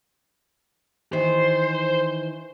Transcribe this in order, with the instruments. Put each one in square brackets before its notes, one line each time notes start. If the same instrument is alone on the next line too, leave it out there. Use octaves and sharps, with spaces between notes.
[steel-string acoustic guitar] D#3 E3 [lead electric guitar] C5